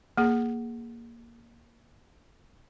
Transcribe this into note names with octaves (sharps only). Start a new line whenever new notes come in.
A#3 G#4